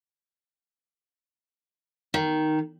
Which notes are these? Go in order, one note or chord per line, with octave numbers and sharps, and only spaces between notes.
D#3